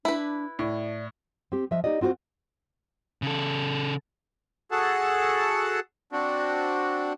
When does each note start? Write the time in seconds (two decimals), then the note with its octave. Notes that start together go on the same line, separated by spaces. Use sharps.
0.05 D4 E4 B4
0.59 A2 D5
1.52 C4 G4
1.71 F3 D#5 E5
1.84 D#4 G4 D5 D#5
2.01 C4 F4 F#4 A4 C5
3.22 C#3 A4
4.71 F#4 G#4 A4 F#5 A5
6.12 C4 D4 F#4